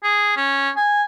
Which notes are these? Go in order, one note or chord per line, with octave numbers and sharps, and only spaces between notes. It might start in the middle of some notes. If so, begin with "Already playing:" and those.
G#4
C#4
G#5